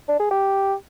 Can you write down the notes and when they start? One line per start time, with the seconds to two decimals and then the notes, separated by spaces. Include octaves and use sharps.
0.08 D4
0.20 G#4
0.31 G4